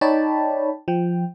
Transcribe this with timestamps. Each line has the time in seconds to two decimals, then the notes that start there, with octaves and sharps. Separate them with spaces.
0.01 D#4 C#5 D5 G5 A5 B5
0.88 F3 G5